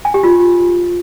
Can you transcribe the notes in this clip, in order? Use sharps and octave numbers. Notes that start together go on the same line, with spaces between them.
G#5
G4
F4